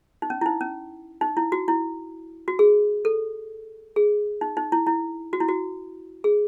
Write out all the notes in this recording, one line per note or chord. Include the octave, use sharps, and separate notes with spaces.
D#4
C#4
E4
D#4
C#4
D#4
E4
F#4
E4
F#4
G#4
A4
G#4
D#4
D#4
E4
E4
F#4
E4
F#4
G#4